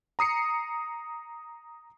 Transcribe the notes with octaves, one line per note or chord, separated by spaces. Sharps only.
A#5 D#6 C7 C#7